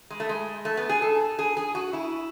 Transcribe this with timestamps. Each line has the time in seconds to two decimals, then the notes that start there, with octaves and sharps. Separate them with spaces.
0.10 G#3
0.20 A3
0.29 G#3
0.65 A3
0.77 B3
0.89 G#4
1.02 A4
1.39 G#4
1.57 G#4
1.75 F#4
1.93 E4